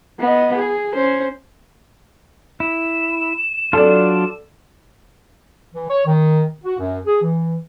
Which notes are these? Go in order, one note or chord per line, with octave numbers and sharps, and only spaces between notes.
B3 D#5
G#4
C#4 C5
E4 E7
F#3 D4 F4 A4 D5
E3
C#5
D#3
F#4
F#2
G#4
E3